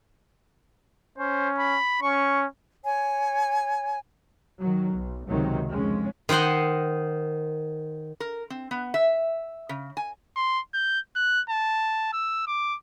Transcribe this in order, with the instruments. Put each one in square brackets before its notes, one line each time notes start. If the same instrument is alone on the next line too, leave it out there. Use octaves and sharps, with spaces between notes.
[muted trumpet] C#4 [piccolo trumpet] C5
[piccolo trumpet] B5
[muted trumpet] C#4 [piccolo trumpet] C#6
[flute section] C#5 G#5
[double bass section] D#3 F#3
B1
C#2 C3 D#3 F#3
F2 G#3 C#4
[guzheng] D#3 C5 D#5 F#5 C6
[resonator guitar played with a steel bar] A#4
C4
B3
E5
C#3
G#5
[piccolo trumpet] C6
G6
F#6
A5
E6
D6